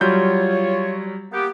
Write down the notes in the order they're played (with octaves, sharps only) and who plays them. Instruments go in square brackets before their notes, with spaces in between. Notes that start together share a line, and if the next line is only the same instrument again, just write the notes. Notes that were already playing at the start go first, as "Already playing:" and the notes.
[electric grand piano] F#3 G3 G6 [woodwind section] F4 C#5
[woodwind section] A#3 B3 G4